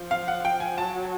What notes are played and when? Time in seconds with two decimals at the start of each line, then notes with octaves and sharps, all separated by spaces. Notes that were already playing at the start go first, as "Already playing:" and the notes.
Already playing: F3
0.11 F5
0.28 F#5
0.45 G5
0.60 G#5
0.77 F#3 A5